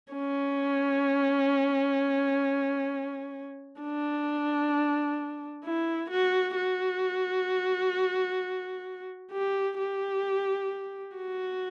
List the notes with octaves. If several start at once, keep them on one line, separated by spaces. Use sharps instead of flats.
C#4
D4
E4
F#4
F#4
G4
G4
F#4